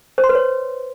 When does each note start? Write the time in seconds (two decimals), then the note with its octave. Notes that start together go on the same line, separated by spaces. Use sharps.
0.18 C5
0.24 C6
0.29 B4
0.35 C#5